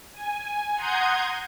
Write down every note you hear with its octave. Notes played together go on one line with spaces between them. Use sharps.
G#5
F#5 A#5 C6 D#6 G6 G#6